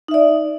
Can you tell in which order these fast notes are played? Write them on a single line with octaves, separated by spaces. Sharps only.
D#4 E5 D5